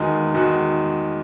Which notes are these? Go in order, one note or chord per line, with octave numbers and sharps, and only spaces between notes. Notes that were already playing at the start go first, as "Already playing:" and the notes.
Already playing: E2 D#3 G#3 D#4 F#4
E2 D#3 G#3 D#4 F#4